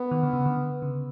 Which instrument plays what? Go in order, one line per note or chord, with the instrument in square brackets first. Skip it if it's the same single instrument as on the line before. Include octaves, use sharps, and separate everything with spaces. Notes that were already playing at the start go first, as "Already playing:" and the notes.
Already playing: [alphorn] B3
[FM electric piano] D#3
D3
C#3
D3
C#3